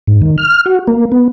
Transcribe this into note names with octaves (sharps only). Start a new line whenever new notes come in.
G#2
D#3
F6
F#4
A#3
B3